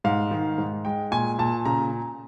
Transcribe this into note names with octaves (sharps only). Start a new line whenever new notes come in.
G#2 F5
D#3
G#2
G#3 G5
A#2 G#5
A#2 A5
C#3 A#5